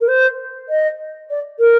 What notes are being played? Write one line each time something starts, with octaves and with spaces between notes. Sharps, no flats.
A#4
C5
D#5
D5
A#4